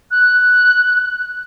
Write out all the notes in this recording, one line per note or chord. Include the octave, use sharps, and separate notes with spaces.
F#6